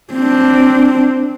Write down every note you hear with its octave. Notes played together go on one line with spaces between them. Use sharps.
C4 D4